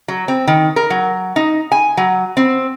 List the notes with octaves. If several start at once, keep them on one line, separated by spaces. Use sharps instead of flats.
F#3
C4
D#3
A#4
F#3
D#4
G#5
F#3
C4